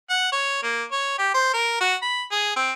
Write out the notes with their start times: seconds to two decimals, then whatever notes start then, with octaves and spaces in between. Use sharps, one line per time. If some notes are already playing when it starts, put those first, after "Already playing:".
0.10 F#5
0.32 C#5
0.63 A#3
0.92 C#5
1.19 G4
1.34 C5
1.54 A#4
1.80 F#4
2.02 B5
2.32 G#4
2.56 C4